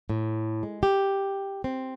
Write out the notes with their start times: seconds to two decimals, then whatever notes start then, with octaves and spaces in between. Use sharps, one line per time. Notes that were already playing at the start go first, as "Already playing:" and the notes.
0.09 A2
0.63 G#3
0.83 G4
1.64 C4